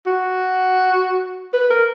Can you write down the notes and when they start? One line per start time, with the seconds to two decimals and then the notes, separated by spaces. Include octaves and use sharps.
0.07 F#4
1.53 B4
1.70 A#4